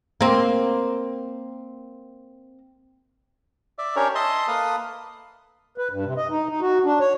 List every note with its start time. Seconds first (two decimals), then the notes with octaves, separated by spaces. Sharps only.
0.21 A#3 C4
3.78 D5 E5
3.96 C#4 D4 G4 A#4 C#5
4.15 D#5 E5 A5 C6 D#6
4.48 A#3 A4 B4 F5 D#6
5.78 B4
5.91 G2
6.05 C3
6.17 D#5
6.30 D#4
6.49 D#4
6.61 F#4
6.85 D4
7.00 C#5